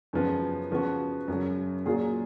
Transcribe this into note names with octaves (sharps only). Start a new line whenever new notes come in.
F#2 C#3 F3 B3
C#3 F3 B3 F#4
F#2 C#3 F#3
A#2 F#3 A#3 F4 G#4